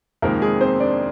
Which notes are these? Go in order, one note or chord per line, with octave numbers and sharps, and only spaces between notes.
F2 C3 D#3 G#3 A#3 A#4
G#3 G#4
C4 C5
D4 D5